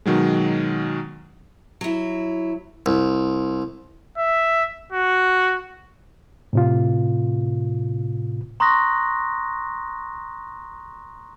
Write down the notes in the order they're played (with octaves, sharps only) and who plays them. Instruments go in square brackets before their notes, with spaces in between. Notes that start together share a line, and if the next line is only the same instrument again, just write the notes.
[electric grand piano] B2 D#3 F#3 G#3
[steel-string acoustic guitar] F#3 E4
[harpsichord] C2
[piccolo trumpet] E5
F#4
[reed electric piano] A2 C3 F4
[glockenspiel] A#5 C6 C#6 D#6 F#6 A#6